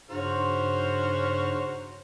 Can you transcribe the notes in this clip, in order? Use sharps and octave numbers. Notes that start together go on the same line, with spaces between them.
G2 C#3 D#4 F#4 C5 C#5 F6